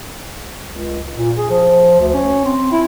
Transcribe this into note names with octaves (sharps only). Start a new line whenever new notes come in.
C#2
A#2
G#4
F3
D2
C#4
C4
E4